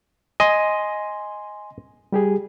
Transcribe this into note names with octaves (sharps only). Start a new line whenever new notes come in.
D#5 G#5 C6
G3 G4 G#4